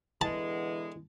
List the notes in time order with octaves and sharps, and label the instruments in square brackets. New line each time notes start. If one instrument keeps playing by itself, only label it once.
[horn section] B2 D3 G#3 [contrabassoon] E3 [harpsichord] A5